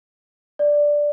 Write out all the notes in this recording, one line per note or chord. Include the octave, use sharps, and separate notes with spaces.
D5